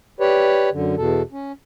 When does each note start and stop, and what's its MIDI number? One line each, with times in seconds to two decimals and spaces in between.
0.20 0.69 67
0.20 0.69 71
0.20 0.69 73
0.20 0.69 74
0.72 0.95 42
0.72 0.95 50
0.97 1.22 40
0.97 1.22 47
0.97 1.22 69
1.32 1.52 61